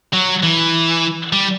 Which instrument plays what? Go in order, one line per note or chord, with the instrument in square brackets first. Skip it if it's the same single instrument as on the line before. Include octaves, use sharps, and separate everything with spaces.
[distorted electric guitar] F#3
E3
G3